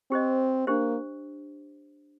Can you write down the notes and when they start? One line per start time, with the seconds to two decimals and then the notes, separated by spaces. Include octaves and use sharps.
0.11 C4 G4 C5 D#5
0.67 A#3 D4 G4 C5